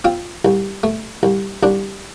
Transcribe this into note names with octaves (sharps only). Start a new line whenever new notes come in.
C4 F4
C2
A3
C2
C2 D4